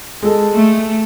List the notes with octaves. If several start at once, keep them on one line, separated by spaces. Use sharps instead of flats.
G#3 A4
A3